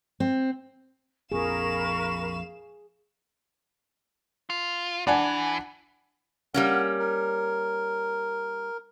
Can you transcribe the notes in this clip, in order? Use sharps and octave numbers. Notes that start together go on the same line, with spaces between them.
C4
A#1 F2 G#4 A#4 F5 B5 C#6 E7
F4
E3 D4 F#5 G#5
G3 A#3 C#4 F#5
A#4